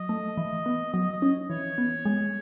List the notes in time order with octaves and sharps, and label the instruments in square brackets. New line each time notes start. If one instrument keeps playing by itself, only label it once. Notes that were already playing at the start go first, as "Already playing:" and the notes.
Already playing: [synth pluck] F#3 [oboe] D#5
[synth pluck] A3
E3
B3
[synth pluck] F#3 [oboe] D#5
[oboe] D#5
[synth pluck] C#4
[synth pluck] E3 [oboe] C#5
[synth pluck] B3
G#3